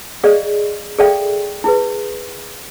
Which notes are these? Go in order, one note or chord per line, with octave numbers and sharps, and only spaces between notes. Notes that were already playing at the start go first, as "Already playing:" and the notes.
G#4 D5 D#5 F5
G#4 A4 D5 E5 F5 G5
E4 G#4 B4